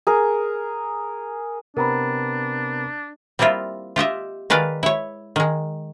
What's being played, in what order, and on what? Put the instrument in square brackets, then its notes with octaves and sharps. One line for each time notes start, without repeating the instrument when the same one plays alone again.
[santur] G#4 A#4
[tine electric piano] C3 B3 C4 [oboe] D4 [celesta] A#4 A#5 B5
[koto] G3 A#3 C4 E4 F4
F4 G4 D#5 E5
D#3 G#3 B4 D5 F5
E4 C#5
D#3 G#3